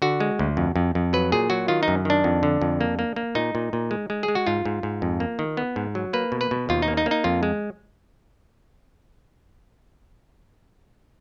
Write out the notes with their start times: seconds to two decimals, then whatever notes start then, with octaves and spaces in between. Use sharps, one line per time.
0.02 D3 F#4
0.20 G#3
0.39 D2
0.57 F2
0.76 F2
0.95 F2
1.13 F#3 B4
1.32 A#2 G#4
1.50 F#3 F#4
1.68 D#3 F4
1.83 D#4
1.88 F#2
2.05 D#3 D4
2.24 F2
2.43 D3
2.61 F2
2.81 A#3
2.99 A#3
3.16 A#3
3.35 A#2 D#4
3.55 A#2
3.73 A#2
3.91 G#3
4.10 G#3
4.23 G#4
4.28 G#3
4.35 F#4
4.47 G#2 F4
4.65 G#2
4.83 G#2
5.02 F2
5.20 A#3
5.39 D#3
5.57 B3
5.76 G#2
5.95 F#3
6.13 A#3 B4
6.32 B2
6.41 B4
6.51 B2
6.69 D#2 F4
6.82 D#4
6.88 A#3
6.97 D#4
7.06 A#3
7.11 D#4
7.24 F2 F4
7.43 G#3